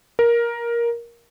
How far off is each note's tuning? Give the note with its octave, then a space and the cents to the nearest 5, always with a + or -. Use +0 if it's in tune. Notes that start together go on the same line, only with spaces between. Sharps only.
A#4 +10